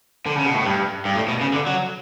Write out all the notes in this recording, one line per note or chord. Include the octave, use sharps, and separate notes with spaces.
D3
C#3
B2
A2
G2
G2
A2
B2
C#3
D3
F#3